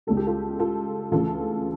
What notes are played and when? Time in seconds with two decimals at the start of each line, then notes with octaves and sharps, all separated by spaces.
0.07 C#2 C#3 G3 A4
0.17 G4
0.27 F4 A4
0.59 F4 A4
1.12 D2 C#3 E3 F4 A4